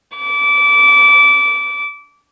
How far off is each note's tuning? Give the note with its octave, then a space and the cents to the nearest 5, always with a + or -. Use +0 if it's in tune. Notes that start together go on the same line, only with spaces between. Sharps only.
D6 -25